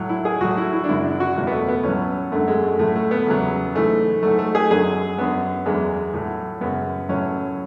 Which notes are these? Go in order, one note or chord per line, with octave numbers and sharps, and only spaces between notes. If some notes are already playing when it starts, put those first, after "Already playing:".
Already playing: A2 F#3
E4
G#4
A2 F#3 F#4
E4
E4
D4
F#2 C#3 F#3 E4
D4
F#4
E2 B2 F#3
B3
A3
B3
A2 F#3 C#4
F#2 D3 F#3 A3
G#3
A3
A2 F#3 A3
A3
B3
E2 C#3 F#3
G#2 E3 A3
G#2 F#3 A3
A3
G#4
F#2 D3 F#3 G#4
F#2 D3 F#3 B3
E2 D3 F#3 G#3
A2 F#3
F#2 C#3 F#3 B3
A2 F#3 C#4